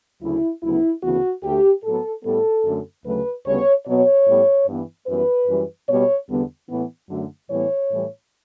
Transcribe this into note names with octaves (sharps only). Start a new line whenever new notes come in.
D2 C#3 F#3 E4
D2 C#3 F#3 B3 E4
D2 C#3 E3 B3 F#4
D2 D3 A3 G4
A2 F#3 B3 A4
A2 G3 B3 A4
F#2 D3 A3
D2 C#3 F#3 A3 B4
D2 C#3 G3 B3 C#5
B2 F#3 B3 C#5
A2 G3 B3
G2 E3 B3
F#2 E3 G3 B3 B4
F#2 E3 G3
B2 G3 B3 C#5
E2 D3 G3 B3
A2 E3 B3
F#2 D3 F#3 A3
A2 E3 G3 B3 C#5
A2 E3 G3